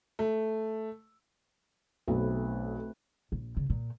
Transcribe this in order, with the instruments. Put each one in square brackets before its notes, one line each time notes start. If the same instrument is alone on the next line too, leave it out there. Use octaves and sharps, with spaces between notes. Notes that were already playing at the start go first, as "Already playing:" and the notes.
[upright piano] A3
[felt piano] B1 [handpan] A3 C4 B4
[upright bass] A#1
C#3
A#2